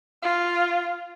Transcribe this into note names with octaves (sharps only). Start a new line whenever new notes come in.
F4